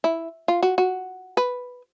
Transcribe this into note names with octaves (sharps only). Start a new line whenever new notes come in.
E4
F4
F#4
F#4
B4